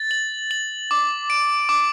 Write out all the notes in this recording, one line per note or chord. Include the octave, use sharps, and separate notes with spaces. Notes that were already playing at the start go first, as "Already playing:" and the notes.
Already playing: A6
F#7
F#7
D6
D7
D6